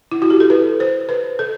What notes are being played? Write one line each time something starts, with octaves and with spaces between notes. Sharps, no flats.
E4
F#4
G4
A4
B4
C5
B4
A4